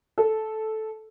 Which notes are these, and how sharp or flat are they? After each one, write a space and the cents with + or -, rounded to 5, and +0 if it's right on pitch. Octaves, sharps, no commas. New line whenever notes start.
A4 -10